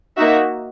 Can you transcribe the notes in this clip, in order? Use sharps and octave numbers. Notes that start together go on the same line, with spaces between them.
A#3 D#4 F#4 E5